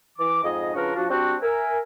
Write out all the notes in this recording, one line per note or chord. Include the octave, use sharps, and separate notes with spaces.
E3 D6
F2 G#2 G#4 D#5
C#3 F3 D4 F#4 A#4 B4
F3 D4 F#4
G3 C4 D4 F#4
A#4 E5 G#5